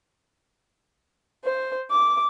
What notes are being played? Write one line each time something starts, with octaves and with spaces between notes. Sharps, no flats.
C5
D6